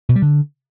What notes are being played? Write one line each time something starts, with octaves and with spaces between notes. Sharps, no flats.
B2
G3
D3